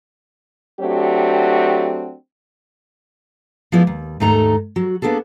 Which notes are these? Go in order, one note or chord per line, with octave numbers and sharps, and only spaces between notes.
F#3 A3 C4 D4 F#4 G4
F3 G#3 B3 E4 D5
D#2
D#2 G#2 D#3 A3 D#4 A#5
F#3 F#4
A#3 B3 D4 G#4 A4